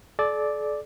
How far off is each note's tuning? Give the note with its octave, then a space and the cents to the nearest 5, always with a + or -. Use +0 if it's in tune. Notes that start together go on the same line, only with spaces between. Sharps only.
A4 -45 D5 +0